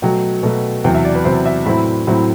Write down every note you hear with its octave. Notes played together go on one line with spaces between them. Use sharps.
B2 F#3 A3 G5
B2 F#3 A3
E2 C3 F#3 G5
E5
D5
B4
E2 C3 F#3 C5
E5
A2 F#3 C4 E4 B5
A2 F#3 C4 E4